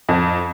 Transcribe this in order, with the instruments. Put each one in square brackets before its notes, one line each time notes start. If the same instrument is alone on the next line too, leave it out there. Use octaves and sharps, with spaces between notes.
[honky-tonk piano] F2